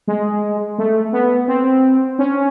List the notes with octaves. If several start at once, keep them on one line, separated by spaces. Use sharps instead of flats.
G#3
A3
B3
C4
C#4